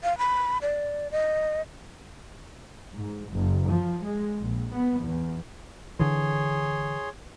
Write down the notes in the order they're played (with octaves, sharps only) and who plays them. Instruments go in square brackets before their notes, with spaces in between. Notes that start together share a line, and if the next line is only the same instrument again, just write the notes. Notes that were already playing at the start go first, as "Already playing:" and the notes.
[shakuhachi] F5
B5
D5
D#5
[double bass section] G#2
F#1
F3
G#3
A#1
B3
E2
[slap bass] D3 E3 [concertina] G#4 C#5 C6